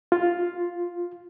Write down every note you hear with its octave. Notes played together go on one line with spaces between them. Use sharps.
F4